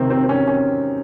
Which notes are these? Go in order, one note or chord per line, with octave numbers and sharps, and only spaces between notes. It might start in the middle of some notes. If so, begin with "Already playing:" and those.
Already playing: C3 D#3 C4
C4
C4
C#4
C#4